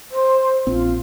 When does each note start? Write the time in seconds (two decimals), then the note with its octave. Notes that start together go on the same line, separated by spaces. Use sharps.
0.11 C5
0.67 A#1 C4 F4